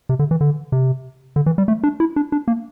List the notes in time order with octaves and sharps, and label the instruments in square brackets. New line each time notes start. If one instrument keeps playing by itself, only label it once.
[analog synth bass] C3
D3
E3
D3
C3
D3
E3
G3
A3
D4
E4
D4
D4
A#3